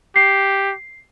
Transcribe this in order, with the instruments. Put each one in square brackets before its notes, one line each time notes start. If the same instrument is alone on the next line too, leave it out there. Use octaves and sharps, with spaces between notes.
[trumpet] G4 [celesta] C7